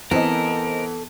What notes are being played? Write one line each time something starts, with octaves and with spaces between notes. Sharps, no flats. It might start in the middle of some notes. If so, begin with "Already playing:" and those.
E3 B3 C4 A4 A#4 D#5